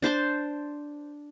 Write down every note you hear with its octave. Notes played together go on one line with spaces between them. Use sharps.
D4 C5 A5 C6